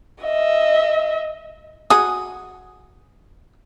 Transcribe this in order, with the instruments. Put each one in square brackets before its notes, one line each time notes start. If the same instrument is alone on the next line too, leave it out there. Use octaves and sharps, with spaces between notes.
[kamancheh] D#5 E5
[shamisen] F#4 G#4 [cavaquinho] D#6